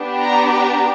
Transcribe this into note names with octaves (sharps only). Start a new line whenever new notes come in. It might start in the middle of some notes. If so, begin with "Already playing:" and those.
Already playing: B3 D4 G4
A#5
A#5